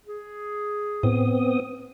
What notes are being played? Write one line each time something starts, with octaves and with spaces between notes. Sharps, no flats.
G#4
A2 B3 C4 D#6